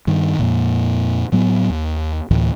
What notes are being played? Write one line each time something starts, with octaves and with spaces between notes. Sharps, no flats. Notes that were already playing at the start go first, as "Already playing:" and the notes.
G2 D#3
F2 A#2
A2 F#3 B3
D#2
D2 A2 E3